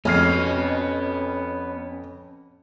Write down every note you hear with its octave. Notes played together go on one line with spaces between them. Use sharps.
F2 B3 C#4 D#5 F6 C7